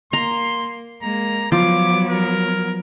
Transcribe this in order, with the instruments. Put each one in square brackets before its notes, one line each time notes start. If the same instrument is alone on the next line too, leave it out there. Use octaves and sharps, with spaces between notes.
[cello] A#3 [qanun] A#5 [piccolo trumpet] C6
[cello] G#3 A#3 [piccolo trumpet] A#5
[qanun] F3 [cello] F#3 B3 [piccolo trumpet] D6
[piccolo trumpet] A#4